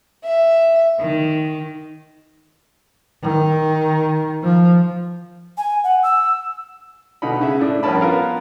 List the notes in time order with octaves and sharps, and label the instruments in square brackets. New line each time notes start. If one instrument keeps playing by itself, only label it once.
[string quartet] E5
D#3
[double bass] D#3
F3
[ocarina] G#5
F#5
E6
[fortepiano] B2 D3 D#4 B5
C#3 E5
A2 D4
A#1 G2 C#4 A#4 A5 B5
B3 F4 A#4 F5